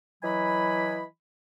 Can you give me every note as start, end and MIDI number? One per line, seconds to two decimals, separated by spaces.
0.23 1.04 52
0.23 1.04 54
0.23 1.04 75
0.23 1.04 80
0.23 1.04 83